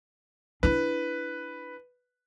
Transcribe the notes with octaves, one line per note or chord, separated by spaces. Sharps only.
D4 E4 B4